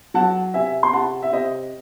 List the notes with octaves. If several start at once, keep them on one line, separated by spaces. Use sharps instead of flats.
F#3 F#5 A5
C3 E5 G#5
C6
C3 F#5 A5
E5
C3 C5 D#5